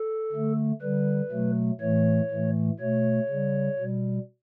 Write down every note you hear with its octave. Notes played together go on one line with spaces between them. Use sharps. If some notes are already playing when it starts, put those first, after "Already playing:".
Already playing: A4
D3 A3
D3 G3 B4
B2 F#3 A3
A2 E3 A3 C#5
A2 E3 A3
B2 A3 C#5
C#3 G3
B2 G3